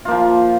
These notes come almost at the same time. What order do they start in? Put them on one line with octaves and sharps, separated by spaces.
F4 A#3 F3